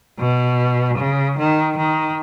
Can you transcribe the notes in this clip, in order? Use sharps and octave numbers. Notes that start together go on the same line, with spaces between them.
B2
C#3
D#3
D#3